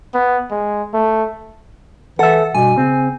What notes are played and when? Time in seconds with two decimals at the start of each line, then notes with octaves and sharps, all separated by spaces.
0.14 B3
0.51 G#3
0.93 A3
2.19 E3 A4 E5 F#5
2.55 G2 B2 G#5
2.77 C#3 C4